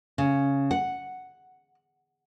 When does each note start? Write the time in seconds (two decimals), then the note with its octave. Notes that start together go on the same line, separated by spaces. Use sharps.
0.18 C#3
0.71 F#5